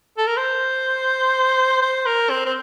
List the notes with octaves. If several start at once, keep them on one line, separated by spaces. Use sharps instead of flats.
A4
A#4
C5
C5
A#4
C4
C4